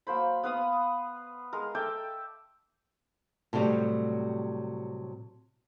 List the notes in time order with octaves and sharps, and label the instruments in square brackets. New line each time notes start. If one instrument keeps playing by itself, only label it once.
[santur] F#3 A#3 C5 B5
B3 B4 F5 D#6
G#3 A#4
A4 E5 G5 D6
[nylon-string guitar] A2 C3 F#3 G3